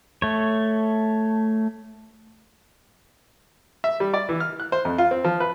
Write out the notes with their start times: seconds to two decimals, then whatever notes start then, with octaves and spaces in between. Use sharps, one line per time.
0.22 A3 C#5
3.84 E5
4.00 G3
4.14 D5
4.29 E3
4.40 F6
4.60 F#6
4.72 C5
4.85 F2
4.98 F4
5.11 C4
5.24 F3
5.40 B4